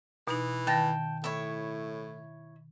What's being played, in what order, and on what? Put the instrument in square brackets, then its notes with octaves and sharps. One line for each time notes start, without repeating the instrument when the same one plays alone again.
[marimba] B2 D#4 [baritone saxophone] E3
[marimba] D#3 A#6 [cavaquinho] G5 A5
[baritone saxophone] A2 [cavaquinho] E4 C#5